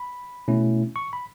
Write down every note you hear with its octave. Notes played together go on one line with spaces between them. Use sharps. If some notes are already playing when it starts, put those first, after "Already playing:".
Already playing: B5
B2 A3 C#4 E4
C#6
B5